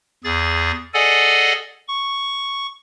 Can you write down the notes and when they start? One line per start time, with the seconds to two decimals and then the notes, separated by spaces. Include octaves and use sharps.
0.24 E2 G#4 A6
0.94 G#4 A4 D5 D#5 F#5 G#5
1.88 C#6